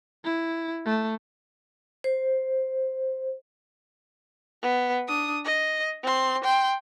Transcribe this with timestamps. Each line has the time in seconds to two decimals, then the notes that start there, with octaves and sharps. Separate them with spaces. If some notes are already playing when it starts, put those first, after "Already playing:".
0.24 E4
0.86 A3
2.04 C5
4.62 B3
5.08 D4 D#6
5.45 D#5
6.03 C4 C6
6.44 G5 C6